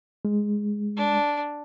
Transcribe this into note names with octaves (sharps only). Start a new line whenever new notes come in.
G#3
D4